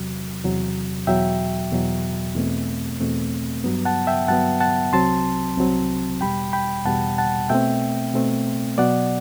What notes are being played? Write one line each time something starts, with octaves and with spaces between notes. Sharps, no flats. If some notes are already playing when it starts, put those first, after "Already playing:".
Already playing: E2 C3 F#3
E2 C3 F#3
E2 B2 F#3 E5 G5
E2 B2 F#3
E2 B2 A3 C4
E2 B2 A3 C4
G2 F#3 B3
F#5 A5
E5 G5
G2 F#3 B3 F#5 A5
F#5 A5
C2 C3 F#3 C4 A5 C6
C2 C3 F#3 C4
E2 B2 G3 G5 B5
G5 B5
E2 B2 G3 F#5 A5
F#5 A5
B2 A3 C4 E5 G5
B2 A3 C4
B2 F#3 B3 D5 F#5